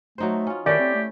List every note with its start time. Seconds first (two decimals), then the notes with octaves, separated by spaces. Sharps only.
0.18 F#3 A3 D#4 C5
0.47 C#4 F4
0.66 D#3 A3 C#4 E4 G4 D5
0.79 C4
0.94 A3